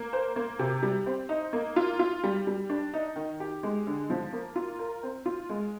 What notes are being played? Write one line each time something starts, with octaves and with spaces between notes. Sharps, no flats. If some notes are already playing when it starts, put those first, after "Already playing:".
Already playing: A#3
C5
A#3
C3
G3
C4
D#4
A#3
F4
F4
G3
G3
D4
D#4
D#3
G4
G#3
D3
F3
A#3
F4
A#4
C4
F4
G#3